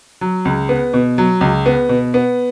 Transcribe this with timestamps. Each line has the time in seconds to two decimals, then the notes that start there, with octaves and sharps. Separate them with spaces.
0.21 F#3
0.45 C#2
0.69 B3
0.94 B2
1.18 F#3
1.41 C#2
1.66 B3
1.89 B2
2.14 B3